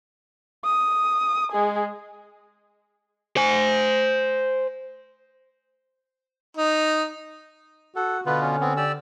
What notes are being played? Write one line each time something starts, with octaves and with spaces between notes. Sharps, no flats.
D#6
G#3 G#4
C5 G#5
D#4
F#4 A4 F#5
B2 D3 B3 F4 B4
C#4
B3 C4
G4 D5 E6